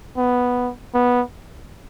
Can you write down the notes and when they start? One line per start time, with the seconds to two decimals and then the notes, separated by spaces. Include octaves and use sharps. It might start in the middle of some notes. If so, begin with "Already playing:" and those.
0.17 B3
0.94 B3